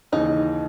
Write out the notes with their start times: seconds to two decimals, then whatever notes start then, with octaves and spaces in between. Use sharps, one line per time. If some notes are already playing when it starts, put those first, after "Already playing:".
0.12 D#2 C#3 E3 D#4